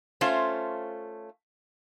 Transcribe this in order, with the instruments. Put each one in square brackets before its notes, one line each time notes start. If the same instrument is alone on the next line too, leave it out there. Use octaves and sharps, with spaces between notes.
[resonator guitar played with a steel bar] A3 C#4 F4 C5